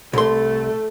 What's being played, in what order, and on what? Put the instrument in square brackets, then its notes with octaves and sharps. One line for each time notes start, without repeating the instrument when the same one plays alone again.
[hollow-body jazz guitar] C2 C6 [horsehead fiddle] A3 A4